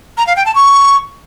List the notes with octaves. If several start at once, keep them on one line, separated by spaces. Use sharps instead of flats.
A#5
F5
G5
A5
C#6